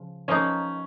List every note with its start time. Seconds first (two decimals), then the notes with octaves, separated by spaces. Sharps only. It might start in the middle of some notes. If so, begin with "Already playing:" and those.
Already playing: C#3 F3
0.28 F3 A#3 C#4 D#4